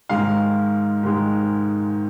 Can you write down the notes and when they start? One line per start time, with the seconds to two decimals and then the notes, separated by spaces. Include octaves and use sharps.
0.09 G#2 D#3 G#3 F5
1.03 G#2 D#3 G#3